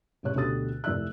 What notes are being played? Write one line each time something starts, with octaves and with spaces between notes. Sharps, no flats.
A1 F#2 B2 G4 C#5 F#6
D2 B2 D3 G4 D#6 A6
F1 E3 D5 E5 E6 F#6